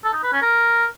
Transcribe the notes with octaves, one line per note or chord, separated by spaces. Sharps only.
A4
D#4
B4
C#4
A#4